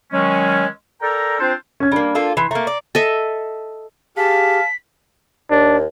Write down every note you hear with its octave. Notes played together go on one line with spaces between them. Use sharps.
D#3 F#3 G#3 C#4
A4 A#4 D5 G5 A#5
C4 D4 F4 C5
C#4 G#6
G3 A#3 D4
A#3 F4 A4
E3 C6 C7
A3 A#3 A#5
D5
A4 D#5 E5
G4 G#4 F5 A5 B6
D#2 D4